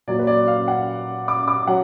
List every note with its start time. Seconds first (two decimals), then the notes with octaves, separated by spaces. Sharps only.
0.07 A#2 F#3 D5
0.19 B4
0.27 D5
0.48 F5
0.68 F#5
1.28 D6
1.48 D6
1.67 F#3 F#5